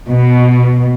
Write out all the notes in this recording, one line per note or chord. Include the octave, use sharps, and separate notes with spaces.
B2